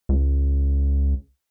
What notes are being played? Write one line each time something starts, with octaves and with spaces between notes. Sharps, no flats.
C#2